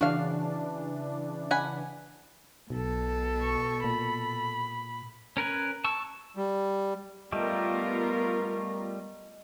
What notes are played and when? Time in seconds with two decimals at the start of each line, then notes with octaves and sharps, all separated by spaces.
0.01 C#3 E3 D4 F#4 F5
1.51 F#5 G#5 B5
2.70 B1 B2 A4
3.42 C#6
3.84 A#2 B5
5.37 C#4 A#4 B4 G#5
5.84 A5 C#6 E6
6.37 G3
7.32 G3 A3 B3 F4 G4 A#4 D#5